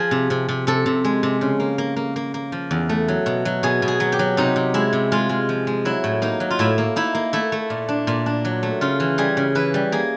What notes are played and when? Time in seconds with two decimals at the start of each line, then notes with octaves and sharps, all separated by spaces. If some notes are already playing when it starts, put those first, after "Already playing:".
Already playing: F3 G#4
0.11 C3
0.30 C3
0.48 C3
0.67 C3 A4
0.86 C3
1.04 G#3
1.23 C3
1.41 C#3
1.60 A#3
1.78 A#3
1.96 A#3
2.16 A#3
2.34 A#3
2.52 F3
2.71 E2
2.89 A3
3.08 F#3
3.26 B2
3.45 F#3
3.63 B2 G#4
3.82 B2
3.88 G#4
4.00 F#3
4.12 G4
4.19 F#3
4.37 C3 D#4
4.56 C3
4.74 G#3 E4
4.93 C3
5.12 G#3 F4
5.29 G#3
5.49 F3
5.67 G#3
5.85 F#3 E4
6.04 A2
6.22 A#3 D#4
6.40 F#3
6.51 F4
6.59 A2 E4
6.78 A#3
6.96 D#4 E4
7.15 A#3
7.33 A3 E4
7.52 A3
7.70 A#2
7.88 D4
8.07 A#2
8.26 D4
8.45 F#3
8.63 A3
8.81 C#3 F4
9.00 E3
9.18 G3 G#4
9.37 C#3
9.55 E3 B4
9.74 G3
9.92 A#3 G#4